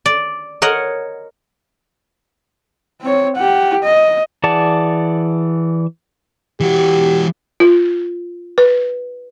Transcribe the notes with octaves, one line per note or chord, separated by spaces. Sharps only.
D5
A#4 C#5 D#5 F#5
C4 C#5
G4 F#5
D#5
E3 G#4 D5 F#5 A5
E3 F#4 G4
F4
B4